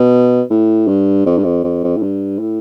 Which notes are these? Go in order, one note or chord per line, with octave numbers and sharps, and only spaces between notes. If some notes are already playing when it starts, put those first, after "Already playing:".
Already playing: B2
A2
G2
F2
G2
F2
F2
F2
A2
G2
A2